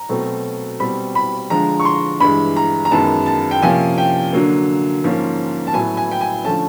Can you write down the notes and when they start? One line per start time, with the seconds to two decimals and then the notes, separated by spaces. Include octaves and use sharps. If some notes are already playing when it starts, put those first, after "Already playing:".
Already playing: A#5
0.09 B2 F#3 A3 C4
0.80 B2 G3 C4 B5
1.15 B5
1.50 D3 F3 G#3 A#5
1.80 C#6
1.85 C6
2.20 G2 E3 G#3 B5
2.56 A#5
2.85 A#5
2.91 F#2 D#3 G#3 B3 A5
3.26 A5
3.51 G5
3.62 C3 F3 A#3 C#4 G#5
3.98 G5
4.33 D3 F#3 A#3
5.04 G#2 F3 A#3 C#4
5.67 A5
5.73 A2 F#3 B3 G#5
5.97 G#5
6.11 G5
6.21 G#5
6.44 D3 F3 A3 C#4 A5